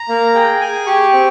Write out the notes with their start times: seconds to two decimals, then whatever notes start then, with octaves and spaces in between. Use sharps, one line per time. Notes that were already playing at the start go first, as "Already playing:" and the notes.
Already playing: A#5
0.09 A#3
0.35 G#4 G5
0.61 G#4 G#5
0.87 G4 C#6
1.13 C4